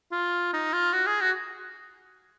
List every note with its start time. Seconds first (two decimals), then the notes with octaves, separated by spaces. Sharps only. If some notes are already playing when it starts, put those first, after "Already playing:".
0.11 F4
0.53 D#4
0.73 F4
0.93 F#4
1.06 G#4
1.21 F#4